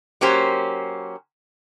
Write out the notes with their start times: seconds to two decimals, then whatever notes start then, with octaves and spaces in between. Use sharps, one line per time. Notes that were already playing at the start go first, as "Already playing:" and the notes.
0.21 F#3 A#3 C#4 G4 C5